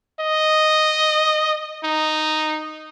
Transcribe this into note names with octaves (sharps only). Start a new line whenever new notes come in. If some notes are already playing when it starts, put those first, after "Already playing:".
D#5
D#4